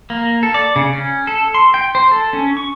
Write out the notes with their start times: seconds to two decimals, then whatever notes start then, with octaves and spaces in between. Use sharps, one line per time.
0.10 A#3
0.43 A4
0.54 D5
0.76 C#3
0.93 C#4
1.27 A4
1.54 C6
1.74 G5
1.95 C5
2.11 A4
2.33 C#4
2.57 C#6